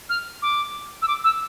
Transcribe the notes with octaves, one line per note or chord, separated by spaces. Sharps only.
F6
D6
E6
D6
E6